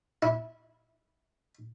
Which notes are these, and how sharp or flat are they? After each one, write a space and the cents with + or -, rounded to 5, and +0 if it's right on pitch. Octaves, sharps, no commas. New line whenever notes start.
E4 -20